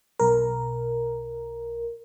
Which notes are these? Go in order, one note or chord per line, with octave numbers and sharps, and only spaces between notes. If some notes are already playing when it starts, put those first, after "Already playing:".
B1 A#4